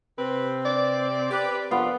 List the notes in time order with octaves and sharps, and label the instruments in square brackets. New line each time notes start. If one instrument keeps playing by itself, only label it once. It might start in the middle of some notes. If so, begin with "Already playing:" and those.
[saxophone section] C3 C4 [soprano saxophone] B4
[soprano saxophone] D5
[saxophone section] G4 B4
[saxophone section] F2 D4 F4 [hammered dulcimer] B3